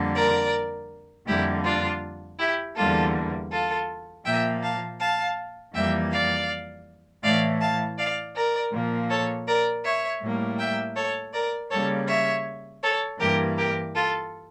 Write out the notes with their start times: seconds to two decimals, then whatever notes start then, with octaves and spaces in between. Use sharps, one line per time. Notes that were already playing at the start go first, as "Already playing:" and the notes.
Already playing: F2 D3 G3 A#3
0.15 A#4 D5
1.27 F2 D3 G3 A#3 E4 G4
1.64 D4 F4
2.38 E4 G4
2.76 E2 D3 G3 A#3 F4 A4
3.51 F4 A4
4.25 A#2 F3 A#3 E5 G5
4.62 F5 A5
5.00 F5 A5
5.74 F2 E3 G3 A#3 E5 G5
6.11 D5 F5
7.23 A2 E3 A3 D5 F5
7.60 F5 A5
7.98 D5 F5
8.35 A#4 D5
8.72 A#2 F3 A#3
9.09 A4 C#5
9.47 A#4 D5
9.84 C#5 E5
10.21 A2 G3 A#3
10.58 E5 G5
10.95 A4 C#5
11.33 A#4 D5
11.70 C#3 G3 A#3 A4 C#5
12.07 C#5 E5
12.82 A4 C#5
13.19 G2 E3 A#3 G4 A#4
13.56 G4 A#4
13.94 F4 A4